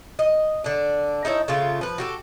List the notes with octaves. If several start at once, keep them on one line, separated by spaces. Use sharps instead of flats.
D#5
D3 D4
D#4 E4 A4 C#5
C#3 A3 F4
F3 B4
F#4 G4 A4